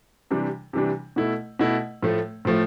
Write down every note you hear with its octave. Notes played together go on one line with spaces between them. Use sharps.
C3 E3 G3 D4
C3 E3 G3 D4
B2 A3 E4
B2 A3 E4
A2 F3 A3
A2 F3 A3